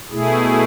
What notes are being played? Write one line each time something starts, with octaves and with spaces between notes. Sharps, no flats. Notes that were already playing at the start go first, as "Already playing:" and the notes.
B2 A3 E4 G#4